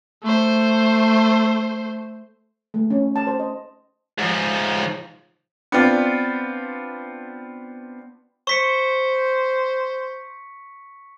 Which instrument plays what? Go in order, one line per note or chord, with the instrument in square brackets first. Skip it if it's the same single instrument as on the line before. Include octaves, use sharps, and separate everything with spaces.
[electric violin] A3 C5
[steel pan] A3
C#4
A5
C5
D#5
[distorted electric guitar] G#2 F3
[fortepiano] B3 C4 D4 F4
[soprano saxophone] C5 [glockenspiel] C#6 B6 C#7